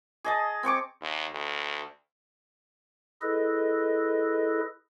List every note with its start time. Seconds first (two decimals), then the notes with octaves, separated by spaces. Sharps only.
0.24 G#4 D#5 A5
0.63 C4 G#5 C#6 D6
1.01 D#2
1.32 D2
3.22 E4 G#4 A4 B4 D#5